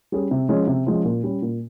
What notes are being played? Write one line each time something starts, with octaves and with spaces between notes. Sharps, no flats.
G3 C#4 G#4
C3
F3 G#3 C#4
C3
F3 G#3 C#4
A#2
G3 C#4
A#2